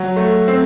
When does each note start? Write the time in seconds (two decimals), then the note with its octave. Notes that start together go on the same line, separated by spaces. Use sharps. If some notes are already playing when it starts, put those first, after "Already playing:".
Already playing: F#3
0.17 A3
0.48 C4